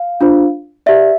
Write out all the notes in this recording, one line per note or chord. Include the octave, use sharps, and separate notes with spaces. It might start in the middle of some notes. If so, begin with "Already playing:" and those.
Already playing: F5
D4 F4 C5
G4 D5 E5